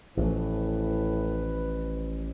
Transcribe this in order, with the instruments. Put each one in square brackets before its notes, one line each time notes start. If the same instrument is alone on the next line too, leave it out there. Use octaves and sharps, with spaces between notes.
[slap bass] A1 F3 [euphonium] A2 [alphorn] B4